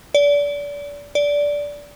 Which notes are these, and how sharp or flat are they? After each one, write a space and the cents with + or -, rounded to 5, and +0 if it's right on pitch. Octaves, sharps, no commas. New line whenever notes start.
D5 -30
D5 -15